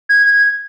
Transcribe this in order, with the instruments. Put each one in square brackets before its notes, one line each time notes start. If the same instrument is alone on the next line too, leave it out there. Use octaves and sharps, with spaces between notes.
[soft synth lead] G#6